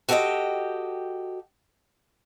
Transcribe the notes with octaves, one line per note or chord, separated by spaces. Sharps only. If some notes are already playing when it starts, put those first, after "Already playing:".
F#4 G4 A4 A#4 D#5 G5